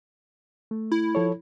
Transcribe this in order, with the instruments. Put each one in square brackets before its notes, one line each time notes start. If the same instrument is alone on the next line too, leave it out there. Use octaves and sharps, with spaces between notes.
[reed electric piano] A3
[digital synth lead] E4
[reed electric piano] F3 A4 C#5